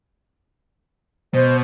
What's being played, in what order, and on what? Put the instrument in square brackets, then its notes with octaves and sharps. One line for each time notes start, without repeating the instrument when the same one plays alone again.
[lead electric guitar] B2 [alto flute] C5